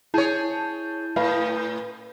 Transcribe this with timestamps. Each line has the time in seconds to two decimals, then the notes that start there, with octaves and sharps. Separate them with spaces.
0.14 E4 G#4 C#5 A5 G6
1.16 A2 B4 F5